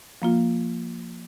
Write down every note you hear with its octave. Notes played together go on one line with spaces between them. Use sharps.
F3 A#3 F4